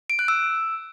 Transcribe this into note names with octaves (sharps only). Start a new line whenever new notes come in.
D7
F#6
E6